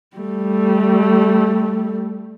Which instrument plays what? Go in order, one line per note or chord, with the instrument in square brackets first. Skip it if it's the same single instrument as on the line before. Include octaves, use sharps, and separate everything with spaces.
[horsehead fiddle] G3 A3